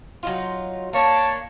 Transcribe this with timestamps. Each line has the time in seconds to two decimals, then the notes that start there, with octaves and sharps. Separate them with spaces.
0.23 F#3 D#4 F4
0.93 A#3 D4 C#5 A5